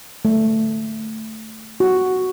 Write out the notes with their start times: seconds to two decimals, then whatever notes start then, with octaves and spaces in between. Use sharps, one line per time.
0.25 A3
1.80 F#4